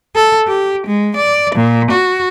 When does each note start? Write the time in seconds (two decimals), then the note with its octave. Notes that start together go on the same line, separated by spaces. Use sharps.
0.15 A4
0.47 G4
0.87 G#3
1.16 D5
1.55 A#2
1.91 F#4